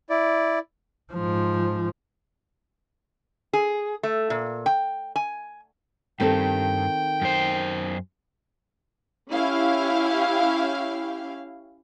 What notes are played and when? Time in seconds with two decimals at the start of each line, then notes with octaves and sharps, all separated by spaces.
0.10 E4 D5
1.13 G#2 F3
3.53 G#4
4.03 A3
4.30 A#2
4.66 G5
5.16 G#5
6.20 G2 D#3 C4 A4 G5
7.21 F#2 C5
9.31 C#4 E4 G4 F5